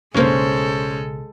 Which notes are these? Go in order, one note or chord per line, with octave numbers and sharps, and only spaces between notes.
B1 G2 C#3 G#3 A#3 C#4 A4 C5